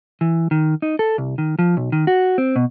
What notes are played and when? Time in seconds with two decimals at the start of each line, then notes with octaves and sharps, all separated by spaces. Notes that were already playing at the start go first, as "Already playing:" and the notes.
0.21 E3
0.51 D#3
0.82 D#4
0.99 A4
1.18 C2
1.38 D#3
1.59 F3
1.77 B1
1.92 D#3
2.07 F#4
2.38 C4
2.56 B2